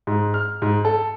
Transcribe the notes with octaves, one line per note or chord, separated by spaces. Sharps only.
G#2
F6
G#2
A4